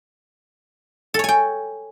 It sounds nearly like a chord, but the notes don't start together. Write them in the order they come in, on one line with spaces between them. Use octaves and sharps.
A4 C#5 G#5 G5